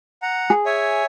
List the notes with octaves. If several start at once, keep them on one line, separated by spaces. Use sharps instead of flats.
F#5 A#5
G#4
C#5 E5 G#5